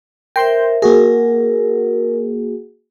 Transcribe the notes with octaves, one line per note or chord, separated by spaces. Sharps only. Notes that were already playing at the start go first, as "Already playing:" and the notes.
A#4 C5 E5 G5 C6 G6
A#3 F#4 G#4 A#4